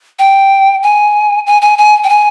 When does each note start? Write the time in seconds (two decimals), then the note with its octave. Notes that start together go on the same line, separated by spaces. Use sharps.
0.19 G5
0.83 G#5
1.46 G#5
1.62 G#5
1.78 G#5
2.04 G5
2.09 G#5